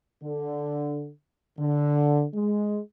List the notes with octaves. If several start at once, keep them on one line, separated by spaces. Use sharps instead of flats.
D3
D3
G#3